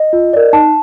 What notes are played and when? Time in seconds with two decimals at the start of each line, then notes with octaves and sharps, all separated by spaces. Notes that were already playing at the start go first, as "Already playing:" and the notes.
Already playing: D#5
0.13 F4
0.33 A#4 D5
0.53 D#4 A5